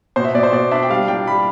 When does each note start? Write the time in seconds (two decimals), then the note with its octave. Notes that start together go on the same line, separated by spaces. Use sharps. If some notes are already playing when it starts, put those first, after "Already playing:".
0.16 B2 C5
0.25 E5
0.35 B2 D5
0.43 C5
0.52 B2 D5
0.71 D4 E5
0.83 G5
0.90 G3 F5
1.08 C2 G5
1.27 G3 B5